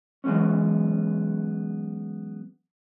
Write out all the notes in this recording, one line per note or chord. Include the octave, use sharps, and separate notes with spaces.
E3 F#3 G#3 B3 C#4